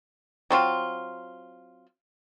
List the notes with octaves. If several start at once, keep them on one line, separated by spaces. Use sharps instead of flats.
F#3 C4 F4